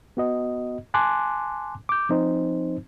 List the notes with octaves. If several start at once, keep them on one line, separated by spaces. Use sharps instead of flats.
B3 F#4 D#5
G#5 A5 C6 D6 F#6
D6 G6
F3 C4 D#4 C5